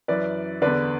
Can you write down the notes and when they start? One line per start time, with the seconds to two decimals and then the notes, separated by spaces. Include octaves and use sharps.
0.08 F#2 E3 B4 D5
0.62 E2 D3 B4 D5